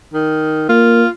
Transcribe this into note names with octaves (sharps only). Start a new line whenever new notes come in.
D#3
A#3 F4